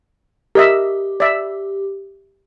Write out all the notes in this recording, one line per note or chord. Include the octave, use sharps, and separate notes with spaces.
G4 A#4 D#5 E5
D5 E5